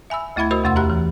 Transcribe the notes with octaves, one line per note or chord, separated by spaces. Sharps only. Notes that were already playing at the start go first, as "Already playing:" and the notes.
E5 G#5 B5 E6
D2 A3 E4 E5 B5 G#6
F#4 A#4 C5 D#5 B5 E6
E2 C3 A3 F#5 C6 E6
G4 E5 A#5 B5 F#6
E3